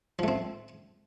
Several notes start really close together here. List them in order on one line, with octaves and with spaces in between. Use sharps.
F3 A3 C4